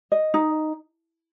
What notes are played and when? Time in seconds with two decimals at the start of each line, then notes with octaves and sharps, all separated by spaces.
0.12 D#5
0.34 D#4